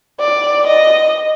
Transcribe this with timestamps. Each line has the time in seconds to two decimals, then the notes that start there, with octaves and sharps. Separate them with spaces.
0.20 D5
0.67 D#5